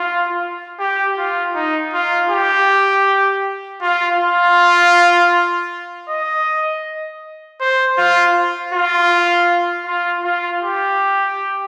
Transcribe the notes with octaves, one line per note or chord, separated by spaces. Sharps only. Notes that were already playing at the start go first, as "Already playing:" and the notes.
Already playing: F4
G4
F4
D#4
F4
G4
F4
F4
D#5
C5
F4
F4
F4
F4
G4